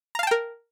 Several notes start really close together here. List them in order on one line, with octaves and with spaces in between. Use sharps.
A#5 F5 A5 G5 A#4